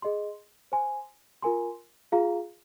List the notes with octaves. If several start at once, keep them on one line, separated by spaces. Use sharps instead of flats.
G#4 D#5 C6
C5 G#5 C6
F4 A#4 G#5 C6
F4 G#4 F5 A#5